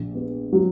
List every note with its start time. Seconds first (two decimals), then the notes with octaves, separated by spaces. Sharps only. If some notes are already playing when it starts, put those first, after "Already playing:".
Already playing: A#1
0.15 B3
0.53 F#3